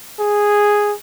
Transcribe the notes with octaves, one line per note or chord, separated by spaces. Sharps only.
G#4